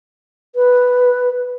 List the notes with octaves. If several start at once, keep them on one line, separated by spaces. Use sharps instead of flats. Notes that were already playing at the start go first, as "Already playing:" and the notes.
B4